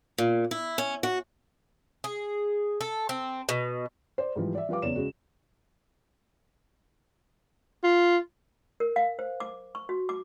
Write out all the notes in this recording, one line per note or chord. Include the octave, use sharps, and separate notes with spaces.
A#2
E4
C#4
F#4
G#4
A4
C4
B2
C5 D5
G#2 E3 F3 G3
D5 E5
F3 G3 B4 F5 D6
F#1 E2 C#5 D5 E7
C#3 G#3 F#4
F4
A#4
F5
C5
D6
C#6
F#4
D6